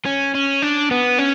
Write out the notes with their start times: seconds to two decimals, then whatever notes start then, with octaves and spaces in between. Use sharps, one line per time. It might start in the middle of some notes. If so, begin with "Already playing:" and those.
0.05 C#4
0.35 C#4
0.62 D4
0.91 B3
1.18 C#4